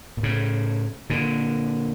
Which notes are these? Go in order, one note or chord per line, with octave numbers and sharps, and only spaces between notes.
A#2
A2 C#3
A#2 D3